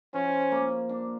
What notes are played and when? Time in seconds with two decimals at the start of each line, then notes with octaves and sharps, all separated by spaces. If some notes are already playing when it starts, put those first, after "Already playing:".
0.14 F3 C#4
0.51 A#3
0.89 D4